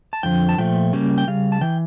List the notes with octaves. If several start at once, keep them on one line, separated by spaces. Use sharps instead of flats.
A5
F2 D3 F3 G5
A5
A#2 F3 A3 G5
C#3 G3 A#3
G5
C#3 G3 F5
A5
E3 G5